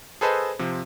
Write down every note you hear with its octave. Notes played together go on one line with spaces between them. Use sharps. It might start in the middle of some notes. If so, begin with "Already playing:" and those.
G#4 A4 B4 C5 D#5 A5
C3 F3